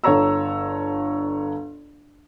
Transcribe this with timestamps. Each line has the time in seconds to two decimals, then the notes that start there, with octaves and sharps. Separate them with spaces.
0.04 G1 A4 C#5 A#5 E6